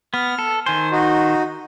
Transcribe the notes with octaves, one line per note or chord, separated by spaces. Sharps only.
B3 F6
A4
D#3 C5 G#5
D#4 F#4